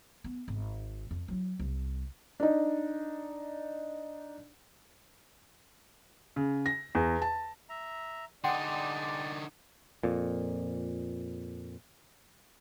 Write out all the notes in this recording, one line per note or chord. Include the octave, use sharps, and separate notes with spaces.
B3
G#1
F2
F#3 E4
C2
D4 D#4
C#3
A#6
E2
A5
E5 A#5
D3 D4 D#4 G#4 D5 F#5 G5 C6
F2 A#2